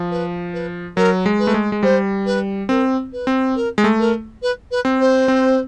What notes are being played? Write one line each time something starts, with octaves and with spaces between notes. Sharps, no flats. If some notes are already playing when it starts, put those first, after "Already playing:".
Already playing: F3
B4
B4
F#3 A#4
G#3
B4
A3
G#3
G#3
G3 C5
B4
C4 A#4
B4
C4
A#4
G#3
A3
A#4
B4
B4
C4
C5
C4